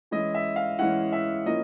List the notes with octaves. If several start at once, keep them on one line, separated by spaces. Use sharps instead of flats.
E3 G#3 C#4 E4 D#5
E5
F5
E3 G#3 C#4 E4 F#5
E5
F3 A#3 C#4 E4 D#5